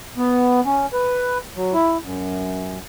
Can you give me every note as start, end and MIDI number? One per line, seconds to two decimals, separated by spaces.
0.17 0.60 59
0.65 0.86 61
0.93 1.38 71
1.56 1.73 54
1.74 1.98 64
2.04 2.78 42